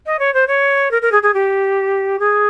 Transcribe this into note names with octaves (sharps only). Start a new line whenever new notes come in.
D#5
C#5
C5
C#5
A#4
A#4
G#4
G#4
G4
G#4